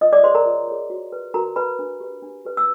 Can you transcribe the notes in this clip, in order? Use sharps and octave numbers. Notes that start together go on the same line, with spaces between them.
F4 D#5 D#6
D5 D6
G#4 C5 C#5 C6
A#4 A#5
F4
G#4 C#5
F#4
B4
F#4 A#4 A#5
B4 B5
D4
G4 B4
D4
G4 B4
E6